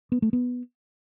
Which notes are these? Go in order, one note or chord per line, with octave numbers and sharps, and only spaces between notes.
B3
A3
B3